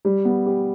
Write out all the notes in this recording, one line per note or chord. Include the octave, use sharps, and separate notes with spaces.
G3
B3
G4